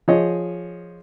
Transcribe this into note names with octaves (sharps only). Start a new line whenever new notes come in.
F3 G#4 C#5 D#5